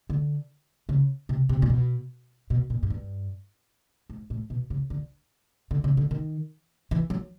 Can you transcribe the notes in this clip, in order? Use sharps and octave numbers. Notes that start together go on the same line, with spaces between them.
D3
C#3
C3
C3
A#2
B2
B2
A#2
G#2
G2
G#2
A2
B2
C#3
D3
D3
C#3
D3
D#3
E3
F#3